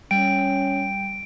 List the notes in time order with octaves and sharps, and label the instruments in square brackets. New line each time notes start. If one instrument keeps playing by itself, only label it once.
[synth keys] G3 [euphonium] C#4 [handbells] G5 [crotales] D7